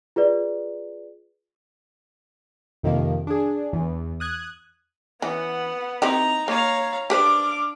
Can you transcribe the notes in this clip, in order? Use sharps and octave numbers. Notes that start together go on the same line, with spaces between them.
F4 G#4 B4 D5
F2 C3 D#3 F3 A#3
D4 G#4
E2
D#6 F#6 G#6
E3 B3 C#4 F#5
C4 D#4 E4 G4 A#5
A#3 C#5 F5 A#5
D4 G4 B4 C5 D6 F6